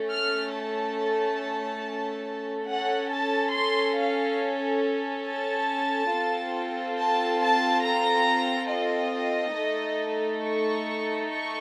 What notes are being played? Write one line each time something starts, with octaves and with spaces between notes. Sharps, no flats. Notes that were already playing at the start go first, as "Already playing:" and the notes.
Already playing: A3 C#4 A4
F6
A5
C#4 A4 F#5
A5
C6
F5
A5
C4 F4 A4
A5
A5
A#5
D#5
A3 D#4 A4
C#6
C#6